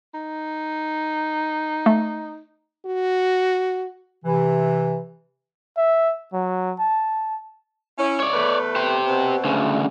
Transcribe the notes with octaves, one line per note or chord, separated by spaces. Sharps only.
D#4
A3
F#4
C3 E3
E5
F#3
A5
C#4 E4
C#5 D5
E2 A3 B4
G4 C5
B2 C4
D2 C#3